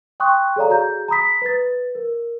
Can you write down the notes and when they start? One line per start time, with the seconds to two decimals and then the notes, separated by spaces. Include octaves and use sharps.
0.20 G5 C6 C#6 D#6 F#6
0.56 G#4 A4 C#5 D5 F5 A#5
0.69 F#4 G#4 A#5 G6
1.08 A#5 B5 D#6 B6
1.42 B4 A6
1.95 A#4